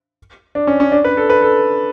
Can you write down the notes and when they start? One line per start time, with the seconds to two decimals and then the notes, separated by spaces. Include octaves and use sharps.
0.55 D4
0.67 C#4
0.80 C#4
0.92 D4
1.04 B4
1.17 A4
1.30 B4
1.42 A4